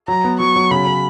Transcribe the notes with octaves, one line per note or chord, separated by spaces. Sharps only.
F#3 A#5
B3
F#3 C#6
F#3
C#3 B5
C#3